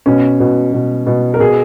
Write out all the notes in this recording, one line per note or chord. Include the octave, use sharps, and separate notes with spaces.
B2 C#4
B2
B2
B2
A#4
B2 G#4